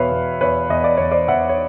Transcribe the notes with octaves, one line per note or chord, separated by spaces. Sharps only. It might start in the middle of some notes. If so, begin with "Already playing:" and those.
Already playing: E2 B2 B4 C#5 E5 F5
E2
E2 B4 C#5
E2 D#5
D5
E2 C#5
C5 D5
E2 E5 F#5
C#5